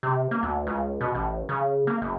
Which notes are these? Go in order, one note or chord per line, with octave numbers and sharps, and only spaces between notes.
C3
A#3
D2
C#2
B2
A1
C#3
A#3
F#1